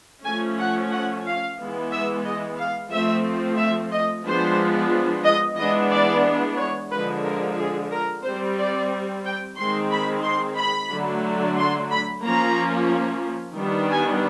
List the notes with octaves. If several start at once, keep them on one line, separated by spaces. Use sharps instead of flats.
F3 A3 C#4 G#5
F#5
F#5
F5
E3 G#3 B3
E5
D#5
F5
F3 A3 C4 E5
E5
D#5
F3 G#3 B3 D4 C5
D#5
E3 G#3 B3 D4 D#5
D5
C#5
D3 F3 G#3 B4
A#4
G#4
A#4
G3 C4 C5
D5
G5
D#3 G#3 C4 C6
B5
C6
B5
D3 F#3 A3 D4
C6
B5
F3 A#3 C#4 A#5
D#3 G3 B3 D4
G#5